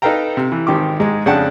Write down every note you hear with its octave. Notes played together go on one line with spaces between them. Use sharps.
D#4 A4 B4 F5 G5 A#5
C3
E3
G#1 D#3 G4 D6
G#2 G#3
F2 C#3 D4 F#5 G5 A5